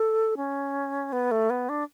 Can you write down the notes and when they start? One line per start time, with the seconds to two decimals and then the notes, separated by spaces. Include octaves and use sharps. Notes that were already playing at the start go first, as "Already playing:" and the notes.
Already playing: A4
0.37 C#4
1.13 B3
1.31 A3
1.50 B3
1.69 D4